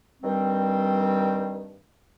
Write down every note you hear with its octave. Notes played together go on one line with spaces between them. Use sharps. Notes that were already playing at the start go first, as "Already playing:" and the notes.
G2 D#3 G3 C4